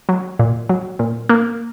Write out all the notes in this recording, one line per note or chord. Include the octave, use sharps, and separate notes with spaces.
F#3
A#2
F#3
A#2
A#3